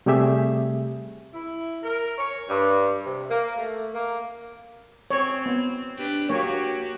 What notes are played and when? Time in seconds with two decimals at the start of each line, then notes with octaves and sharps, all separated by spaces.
0.06 C3 G3 A3 G4 G#4 E5
1.34 E4
1.83 A#4
2.18 C#5
2.49 G2
3.06 C3
3.30 A#3
3.57 A3
3.94 A#3
5.10 C4 C#5
5.46 B3
5.98 D4 G4 B4
6.29 F#3 A#3 F#4 G4 C#5